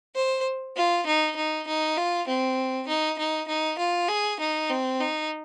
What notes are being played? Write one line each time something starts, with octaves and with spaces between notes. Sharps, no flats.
C5
F4
D#4
D#4
D#4
F4
C4
D#4
D#4
D#4
F4
G#4
D#4
C4
D#4